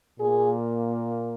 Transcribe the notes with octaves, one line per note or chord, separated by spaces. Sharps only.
A#2 A#3 G#4